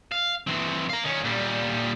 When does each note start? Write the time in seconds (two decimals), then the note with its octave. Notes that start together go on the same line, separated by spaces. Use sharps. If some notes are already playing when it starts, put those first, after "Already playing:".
0.12 F5
0.47 E3 C4
0.90 F5 A#5
1.04 D#3 C#4
1.24 A#2 G3